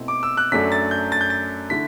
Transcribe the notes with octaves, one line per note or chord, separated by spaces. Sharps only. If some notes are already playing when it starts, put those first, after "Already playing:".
Already playing: B2 A3 C4 E4
D6
E6
F#6
F#2 F#3 A3 D4 B6
A6
G6
A6
G6
A6
D3 A3 E4 B6